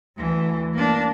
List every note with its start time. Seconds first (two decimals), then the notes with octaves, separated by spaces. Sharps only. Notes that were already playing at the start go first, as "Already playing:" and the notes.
0.18 D2 E3
0.74 A#3 D4